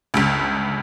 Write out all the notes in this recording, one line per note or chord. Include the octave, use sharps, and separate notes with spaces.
G1 C#2